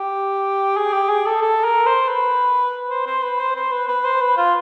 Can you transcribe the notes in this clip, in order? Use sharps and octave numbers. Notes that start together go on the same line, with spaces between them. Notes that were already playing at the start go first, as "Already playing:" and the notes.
Already playing: G4
G#4
G4
G#4
A4
A4
A#4
C5
B4
C5
C5
B4
C5
C5
B4
B4
C5
B4
F4